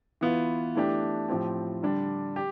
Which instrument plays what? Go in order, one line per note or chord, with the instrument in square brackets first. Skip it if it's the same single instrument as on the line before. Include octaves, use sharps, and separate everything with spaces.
[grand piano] E3 B3 F4
E3 A3 D4 G4
A2 F3 C4 G4
D3 G3 D4
G4